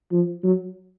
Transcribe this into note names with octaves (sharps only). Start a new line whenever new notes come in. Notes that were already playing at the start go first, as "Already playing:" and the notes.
F3
F#3